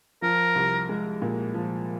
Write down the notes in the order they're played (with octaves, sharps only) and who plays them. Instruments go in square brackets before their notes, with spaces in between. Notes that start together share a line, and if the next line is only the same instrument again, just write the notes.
[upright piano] F3 [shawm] A#4
[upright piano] C2
G#3
A#2
F3